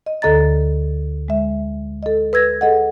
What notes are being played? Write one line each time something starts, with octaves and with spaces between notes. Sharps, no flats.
D#5
D2 D3 A4 D#5 A#5 A6
G#3 E5
A4 D#5
B4 E6 G#6 A#6
G#4 A4 D#5 F#5